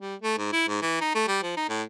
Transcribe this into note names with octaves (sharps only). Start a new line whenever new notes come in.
G3
A3
G#2
E4
G#2
E3
D#4
A3
G3
F3
D#4
A2